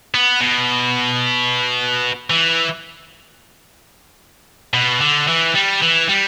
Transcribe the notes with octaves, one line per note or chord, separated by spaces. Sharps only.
B3
B2
E3
B2
D3
E3
G3
E3
G3